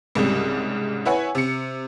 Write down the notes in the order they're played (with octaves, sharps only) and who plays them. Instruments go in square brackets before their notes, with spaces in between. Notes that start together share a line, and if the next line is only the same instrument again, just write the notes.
[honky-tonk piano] C2 G#2 C#3 G3
E4 B4 C#5 F#5 G#5
C3 C#7